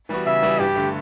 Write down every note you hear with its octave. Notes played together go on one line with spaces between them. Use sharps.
E3 G3 B3 F#4
C#3 E5
E3 G3 B3 F#4
G2 G4
D3 A3